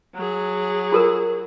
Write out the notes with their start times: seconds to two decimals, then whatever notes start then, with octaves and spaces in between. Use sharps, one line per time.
0.15 F#3 G#4
0.92 F4 A4 A#4